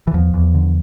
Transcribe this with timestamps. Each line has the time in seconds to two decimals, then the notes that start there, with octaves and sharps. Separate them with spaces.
0.07 E3
0.13 E2 F3
0.34 E2
0.54 D3